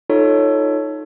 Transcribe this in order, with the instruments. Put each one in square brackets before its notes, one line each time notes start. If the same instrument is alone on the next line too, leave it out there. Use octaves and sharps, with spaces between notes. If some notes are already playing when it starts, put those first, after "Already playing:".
[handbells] D#4 F4 A4 C#5